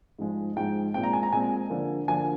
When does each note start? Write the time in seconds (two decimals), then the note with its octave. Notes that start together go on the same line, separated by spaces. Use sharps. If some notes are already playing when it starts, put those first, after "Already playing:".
0.19 G#2 F3 G#3
0.56 G#2 F3 G#3 G5
0.94 A#2 G#3 C4 G5
1.04 A#5
1.13 G#5
1.23 A#5
1.33 A#2 G#3 C4 G#5
1.70 D3 F3 A#3
2.08 D3 F3 A#3 G#5